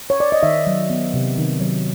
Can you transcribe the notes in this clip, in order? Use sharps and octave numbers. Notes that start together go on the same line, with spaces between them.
C#5
D5
D#5
D#3 E5
F#3
B3
C3
D#3
F#3